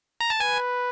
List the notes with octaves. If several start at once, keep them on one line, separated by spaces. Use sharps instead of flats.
A#5
A5
B4 G#5